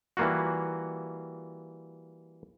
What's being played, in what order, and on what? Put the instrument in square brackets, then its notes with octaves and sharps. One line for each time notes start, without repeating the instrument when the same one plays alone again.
[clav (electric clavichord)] E3 G3 A#3 F4 F#4